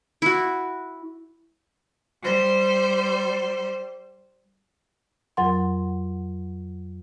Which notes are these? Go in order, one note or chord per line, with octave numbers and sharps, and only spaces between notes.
E4 F#4
G3 C5
F2 F#3 A#4 F#5 C6